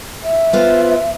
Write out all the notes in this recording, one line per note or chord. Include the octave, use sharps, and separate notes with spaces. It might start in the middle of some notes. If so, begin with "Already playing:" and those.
E5
B3 F4 C5